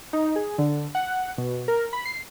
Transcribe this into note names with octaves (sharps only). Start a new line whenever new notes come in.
D#4
G#4
D3
F#5
B2
A#4
B5
C7